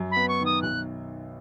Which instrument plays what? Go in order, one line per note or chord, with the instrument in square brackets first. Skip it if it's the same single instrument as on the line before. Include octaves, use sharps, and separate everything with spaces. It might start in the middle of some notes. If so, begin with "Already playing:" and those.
Already playing: [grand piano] F#2
[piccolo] B5
[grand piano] B3
[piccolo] C#6
[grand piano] D#3
[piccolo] D#6
[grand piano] B1 [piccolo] F#6